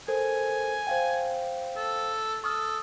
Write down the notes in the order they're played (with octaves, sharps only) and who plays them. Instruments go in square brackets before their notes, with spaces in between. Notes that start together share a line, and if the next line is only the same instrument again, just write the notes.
[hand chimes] A4 A#4 C5 [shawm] G#5
[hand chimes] C5 F5 G5
[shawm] A4
[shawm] A4 [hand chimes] C#6 D#6 F6